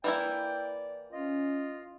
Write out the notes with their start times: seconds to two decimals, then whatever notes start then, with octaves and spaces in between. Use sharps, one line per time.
0.04 E3 A#3 E4 D5 G5
1.12 C#4 F4 D#5